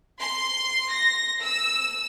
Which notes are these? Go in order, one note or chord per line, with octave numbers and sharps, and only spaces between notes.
C6
A#6
E6